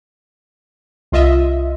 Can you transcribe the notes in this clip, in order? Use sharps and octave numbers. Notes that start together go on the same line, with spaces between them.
C2 F4 D#5 E5